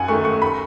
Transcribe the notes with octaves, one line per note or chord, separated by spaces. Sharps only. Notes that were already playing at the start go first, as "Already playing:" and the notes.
Already playing: F#2 F#5 G#5
D#3 A3 C#6
C#6
B5